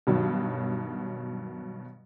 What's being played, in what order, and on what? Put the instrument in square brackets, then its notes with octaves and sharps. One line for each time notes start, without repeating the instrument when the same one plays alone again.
[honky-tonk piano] G2 B2 D#3 F#3